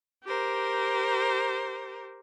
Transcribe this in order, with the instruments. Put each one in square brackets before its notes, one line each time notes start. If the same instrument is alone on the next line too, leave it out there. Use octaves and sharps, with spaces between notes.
[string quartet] G4 A#4 C5